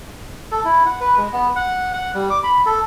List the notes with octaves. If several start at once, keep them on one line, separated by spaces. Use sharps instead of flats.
A4
E4
F#5
B4
G#3
B3
F#5
F#5
G3
D6
B5
A4